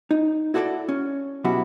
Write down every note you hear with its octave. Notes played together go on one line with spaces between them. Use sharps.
D#4
E4 F#4 A4 C#5 D5
C#4
B2 F#3 E4 F#4 G4